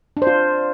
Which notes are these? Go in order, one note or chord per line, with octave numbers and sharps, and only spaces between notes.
D4
C5
F4